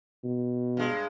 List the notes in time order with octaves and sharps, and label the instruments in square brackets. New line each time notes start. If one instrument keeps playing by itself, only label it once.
[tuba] B2
[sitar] G2 G#3